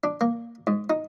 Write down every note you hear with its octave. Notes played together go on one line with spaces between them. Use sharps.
D4
A#3
G#2
D#4